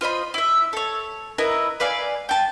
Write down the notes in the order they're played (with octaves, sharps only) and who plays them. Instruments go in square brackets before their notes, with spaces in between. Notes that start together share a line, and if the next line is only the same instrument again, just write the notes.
[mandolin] F4 C5 D#5 B5
E4 E5
A4 C#5
E4 A#4 B4 D#5
B4 D5 F5 G#5
G5 A5